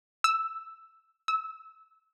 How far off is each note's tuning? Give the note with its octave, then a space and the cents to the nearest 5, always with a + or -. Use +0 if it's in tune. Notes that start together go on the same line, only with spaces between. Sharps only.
E6 +0
E6 -20